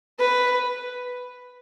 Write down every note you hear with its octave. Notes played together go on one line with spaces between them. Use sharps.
B4